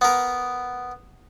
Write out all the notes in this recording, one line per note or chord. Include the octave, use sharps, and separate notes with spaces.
B3 A#4